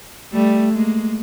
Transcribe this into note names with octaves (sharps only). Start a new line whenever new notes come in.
G3 A3
G#3 A#3